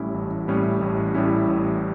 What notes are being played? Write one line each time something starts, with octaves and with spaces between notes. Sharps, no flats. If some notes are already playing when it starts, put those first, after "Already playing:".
Already playing: A1 A2 G3 C#4 E4
A1
A2 G3 C#4 E4
A1
A2 G3 C#4 E4
A1